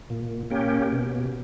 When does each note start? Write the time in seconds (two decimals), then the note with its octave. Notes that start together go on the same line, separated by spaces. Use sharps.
0.10 A#2
0.51 A#3 C#4 G4
0.92 B2